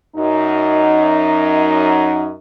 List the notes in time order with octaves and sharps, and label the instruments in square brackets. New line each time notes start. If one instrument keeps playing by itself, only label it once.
[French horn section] F#2 D#4